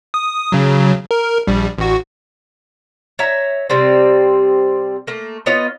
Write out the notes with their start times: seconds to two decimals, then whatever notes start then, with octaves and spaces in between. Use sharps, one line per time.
0.14 D#6
0.52 C#3 F#3
1.11 A#4
1.47 A#1 G3
1.78 A1 F#4
3.19 C#5 E5 A#5
3.70 C3 G3 C4
5.07 A3 A#3
5.46 B3 F4 C#5 D#5